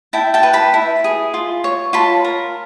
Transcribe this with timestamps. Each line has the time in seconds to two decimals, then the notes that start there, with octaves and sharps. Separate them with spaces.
0.13 E4 G5 A5
0.34 G5 A5
0.43 B4
0.53 A5 B5
0.74 E4
1.04 G#4
1.34 F4
1.64 C#5
1.93 F4 A5 B5
2.25 A#4